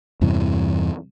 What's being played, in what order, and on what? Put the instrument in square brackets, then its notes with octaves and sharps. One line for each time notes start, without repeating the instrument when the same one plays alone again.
[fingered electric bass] E2 G2 C3 E3